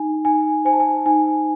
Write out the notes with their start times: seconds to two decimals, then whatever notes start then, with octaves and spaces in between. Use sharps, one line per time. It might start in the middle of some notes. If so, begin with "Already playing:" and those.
Already playing: D#4 G#5
0.25 D#4 G#5
0.65 C5 G#5
0.73 A5
0.80 G#5
1.06 D#4 G#5